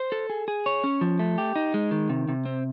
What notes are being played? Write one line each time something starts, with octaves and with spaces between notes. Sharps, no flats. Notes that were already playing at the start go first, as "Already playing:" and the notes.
Already playing: C5
A4
G#4
G#4
C#5
C#4
F3
A3
G4
D#4
G#3
D#3
C3
C3
C4